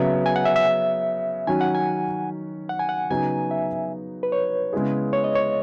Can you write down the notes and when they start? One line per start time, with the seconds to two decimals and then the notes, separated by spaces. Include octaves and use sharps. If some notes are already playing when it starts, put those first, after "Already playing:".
Already playing: C#3 F#3 B3 E5
0.26 G#5
0.36 F#5
0.45 E5
0.56 E5
1.47 D#3 F#3 C#4 F#4 G#5
1.61 F#5
1.75 G#5
2.69 F#5
2.79 G#5
2.89 F#5
3.10 C#3 F#3 B3 D#4 F#4 G#5
3.51 E5
4.23 B4
4.32 C#5
4.73 C#3 G#3 B3 E4 G#4
5.13 C#5
5.24 D#5
5.36 C#5